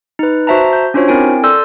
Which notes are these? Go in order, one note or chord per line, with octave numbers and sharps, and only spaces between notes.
D#4 B4
F#4 C5 E5 A5 A#5
G6
C#4 D4 F4 F#4 C5 C#5
C4 E4 A#4 G#5 D7
A4 D5 C6 E6 G6